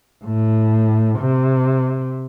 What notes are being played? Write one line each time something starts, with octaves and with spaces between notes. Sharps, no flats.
A2
C3